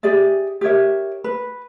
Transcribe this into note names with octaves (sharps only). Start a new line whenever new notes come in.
G4 G#4 D5 E5
G4 A#4 C#5 E5
B4